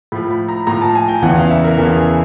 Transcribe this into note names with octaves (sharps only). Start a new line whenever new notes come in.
A2 F3 B5
B5
A#5
A2 F3 A#5
A5
G#5
G5
E2 C#3 E3 F#5
F5
E5
A#4
E2 C#3 E3 A4
G#4